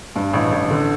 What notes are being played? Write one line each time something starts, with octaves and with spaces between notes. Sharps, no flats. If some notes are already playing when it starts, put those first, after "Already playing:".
G2
A1
A1
D3